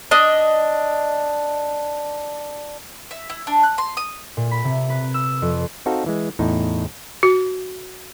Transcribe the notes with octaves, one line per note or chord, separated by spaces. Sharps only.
D4 D#5
E5
E4
D4
F#6
C6
D#6
A#2
B5
C3
B4
E6
F2
C4 D#4 F#4 A4 F5
E3 G#3
E2 A2 D#4
F#4